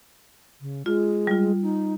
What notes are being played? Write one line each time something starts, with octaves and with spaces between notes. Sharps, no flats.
C#3
G#3 F4
G3 F4
D#4